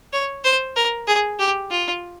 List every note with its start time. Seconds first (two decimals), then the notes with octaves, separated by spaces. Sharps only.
0.13 C#5
0.45 C5
0.76 A#4
1.07 G#4
1.39 G4
1.71 F4